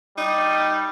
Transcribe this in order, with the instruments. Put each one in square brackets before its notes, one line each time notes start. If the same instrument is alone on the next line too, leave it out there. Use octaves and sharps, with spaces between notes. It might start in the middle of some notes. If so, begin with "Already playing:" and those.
[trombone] G3 [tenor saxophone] D#4